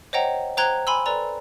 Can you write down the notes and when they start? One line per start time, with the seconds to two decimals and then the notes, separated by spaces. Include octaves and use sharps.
0.13 C5 C#5 D#5 F#5 G5 A#5
0.57 C5 G5 A#5 F#6 G#6 G7
0.87 G#5 B5 C6 E6
1.06 A4 B4 D5 A#5